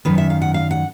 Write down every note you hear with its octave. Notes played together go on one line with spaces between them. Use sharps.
F#2 D#3 B4
E5
F5
F#5
F5
F#5